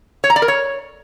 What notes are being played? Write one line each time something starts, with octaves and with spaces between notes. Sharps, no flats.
C#5
A#5
D5
A#4
C#5